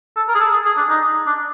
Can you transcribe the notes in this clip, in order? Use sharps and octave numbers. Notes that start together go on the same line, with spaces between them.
A4
A#4
G#4
A4
G#4
G#4
D4
D#4
D4